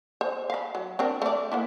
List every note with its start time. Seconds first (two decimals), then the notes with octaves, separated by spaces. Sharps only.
0.21 C5
0.50 F5 B5
0.75 F#3
0.99 C4 D4 A#4
1.22 A3 D5
1.52 A#3 B3 E4